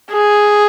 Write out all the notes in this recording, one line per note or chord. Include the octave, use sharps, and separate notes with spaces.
G#4